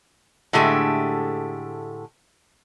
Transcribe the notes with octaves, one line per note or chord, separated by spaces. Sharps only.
A2 D3 G#3 A3 G4